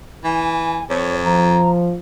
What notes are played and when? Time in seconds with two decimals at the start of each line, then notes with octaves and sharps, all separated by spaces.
0.24 E3 G#5
0.90 F2 C#5
1.25 F3 A#5